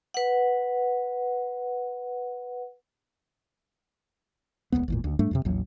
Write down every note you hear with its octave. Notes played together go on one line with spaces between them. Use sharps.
B4 F#5
D1 G1 C#2 B3
G#1 E2 A#2
D2
G#2 G3 A3 D4
F2 A2 C3
A1 D#2 F#3